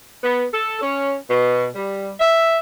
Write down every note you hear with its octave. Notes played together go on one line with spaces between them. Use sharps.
B3
A4
C#4
B2
G3
E5